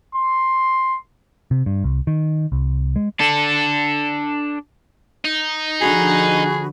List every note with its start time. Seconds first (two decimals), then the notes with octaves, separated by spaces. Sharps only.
0.15 C6
1.51 C3
1.66 G2
1.84 C2
2.07 D#3
2.52 C2
2.96 G#3
3.20 D4 A4
5.25 D#4
5.81 D3 F3 F#4 G#4 B5